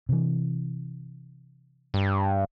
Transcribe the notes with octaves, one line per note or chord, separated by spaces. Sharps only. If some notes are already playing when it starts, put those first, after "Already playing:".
C3 E3
G2